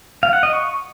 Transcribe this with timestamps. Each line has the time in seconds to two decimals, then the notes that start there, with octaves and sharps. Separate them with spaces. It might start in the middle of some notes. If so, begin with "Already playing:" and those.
0.23 F5
0.33 F#5
0.43 D#5
0.53 C#6